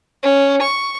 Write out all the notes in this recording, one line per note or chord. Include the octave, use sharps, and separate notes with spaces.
C#4
C#6